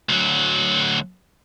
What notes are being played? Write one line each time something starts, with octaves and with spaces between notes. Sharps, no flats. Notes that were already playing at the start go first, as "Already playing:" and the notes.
D2 F#3